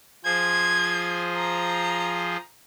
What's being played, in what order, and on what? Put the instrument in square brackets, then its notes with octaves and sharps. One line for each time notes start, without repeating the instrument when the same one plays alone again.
[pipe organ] F3 G#4 C5 [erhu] G#6
[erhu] A#5